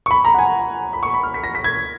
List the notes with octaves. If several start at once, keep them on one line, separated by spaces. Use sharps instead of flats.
C#6
B5
A#5
F#5
G#5
B5
C#6
B5
F6
B6
A#6
B6
G#6